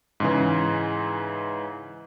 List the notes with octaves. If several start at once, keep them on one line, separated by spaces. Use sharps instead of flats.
G#2 C#3 E3